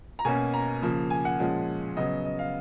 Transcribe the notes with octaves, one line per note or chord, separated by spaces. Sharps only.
A#5
B2 A#3 C#4 G#5
A#5
C#3 F3 A#3
G#5
F#5
A#2 F3 G#3 C#4
C#3 F#3 B3 D#5
D#5
F5